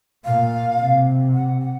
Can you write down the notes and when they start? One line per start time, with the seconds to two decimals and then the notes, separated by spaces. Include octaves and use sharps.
0.25 A#2 F5
0.79 C3
1.34 F#5
1.61 F#5